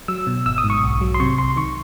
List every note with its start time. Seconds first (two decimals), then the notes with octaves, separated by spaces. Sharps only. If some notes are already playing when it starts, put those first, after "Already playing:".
0.08 F#3 E6
0.27 B2
0.46 G#1 E6
0.58 D#6
0.64 G#2
0.70 C#6
0.83 B1
1.01 F#3
1.14 C6
1.20 C3 C#6
1.38 C2 C6
1.56 D#3 C#6